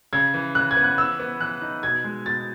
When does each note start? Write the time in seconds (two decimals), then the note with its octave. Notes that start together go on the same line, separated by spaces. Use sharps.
0.13 C#3 G#6
0.34 E3
0.55 C#3 F#6
0.71 G#6
0.77 B3
0.84 F#6
0.98 E3 E6
1.20 B3
1.40 E3 F#6
1.62 D#4
1.83 B2 G#6
2.04 G#3
2.26 B2 A6